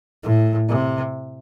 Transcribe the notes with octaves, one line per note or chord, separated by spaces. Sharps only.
A2
C3